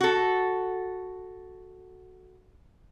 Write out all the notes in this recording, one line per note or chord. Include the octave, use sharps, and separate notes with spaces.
F#4 A4